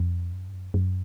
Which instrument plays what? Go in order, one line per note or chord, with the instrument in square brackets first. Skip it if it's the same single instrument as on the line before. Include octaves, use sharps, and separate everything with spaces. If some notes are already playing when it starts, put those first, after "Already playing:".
Already playing: [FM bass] F2
F#2
G2
F#2
F#2